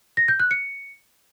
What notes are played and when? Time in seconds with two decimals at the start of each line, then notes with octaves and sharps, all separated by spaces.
0.17 A#6
0.28 G6
0.40 F#6
0.51 C#7